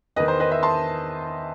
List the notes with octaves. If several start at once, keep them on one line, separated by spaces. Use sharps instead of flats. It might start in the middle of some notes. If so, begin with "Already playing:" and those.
E2 D#3 B4 D#5
C5
B4 D#5
C5 E5
A5 C6